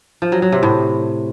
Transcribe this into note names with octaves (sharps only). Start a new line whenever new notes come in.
F3
F#3
F#3
C3
A2